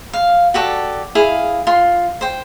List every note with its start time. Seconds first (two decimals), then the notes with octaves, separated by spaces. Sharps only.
0.13 F5
0.54 F#4 G4 A4 D5
1.15 E4 G#4 F5
1.67 F4 C6
2.21 C5 G5